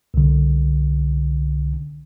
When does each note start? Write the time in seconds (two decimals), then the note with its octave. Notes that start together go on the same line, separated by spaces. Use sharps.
0.14 C2 D3